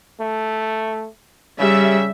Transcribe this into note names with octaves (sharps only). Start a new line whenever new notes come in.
A3
C#3 G3 E5